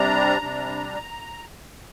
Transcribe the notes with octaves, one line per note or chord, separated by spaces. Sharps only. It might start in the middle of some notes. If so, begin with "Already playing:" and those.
Already playing: C3 G3 D4 A#5
C3 G3 D4